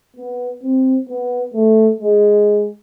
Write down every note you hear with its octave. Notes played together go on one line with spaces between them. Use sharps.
B3
C4
B3
A3
G#3